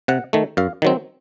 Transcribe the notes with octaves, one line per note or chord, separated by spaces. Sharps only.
C3 F#5
D#3 A3
F#2 F5
D#3 F#3 C4